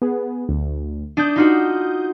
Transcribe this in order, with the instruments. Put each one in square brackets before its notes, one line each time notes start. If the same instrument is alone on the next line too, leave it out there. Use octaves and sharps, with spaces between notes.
[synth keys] B3 G#4
D2
[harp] D4 [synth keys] D#6 G6
[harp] D#4 F4 F#4